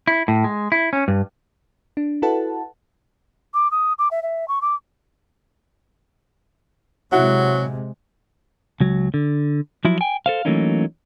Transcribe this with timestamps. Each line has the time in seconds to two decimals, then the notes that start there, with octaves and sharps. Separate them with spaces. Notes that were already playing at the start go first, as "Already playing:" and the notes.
0.07 E4
0.28 A2
0.44 G#3
0.72 E4
0.93 C#4
1.08 G2
1.97 D4
2.22 E4 F#4 A4 B4 F#5 A5
3.54 D6
3.71 D#6
3.99 D6
4.11 E5
4.23 E5
4.48 C#6
4.62 D6
7.12 C3 F#3 G#3 E4 F#4 F#5
8.80 C#2 F#3
9.14 D3
9.85 F3 F#3 E4
10.01 G5 G#5
10.26 A4 C5 F5
10.45 E3 F#3 A3 A#3 C#4 D#4